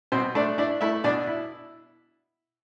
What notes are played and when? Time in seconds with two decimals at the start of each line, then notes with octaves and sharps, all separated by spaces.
0.12 B2 C4 C5
0.35 A3 D4 D5
0.58 D4 E4 D5
0.81 A3 E4 E5
1.04 B2 D4 D5
1.27 E4